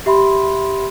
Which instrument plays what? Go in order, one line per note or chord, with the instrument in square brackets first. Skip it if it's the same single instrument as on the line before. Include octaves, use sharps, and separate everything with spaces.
[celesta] G4 E5 B5 C6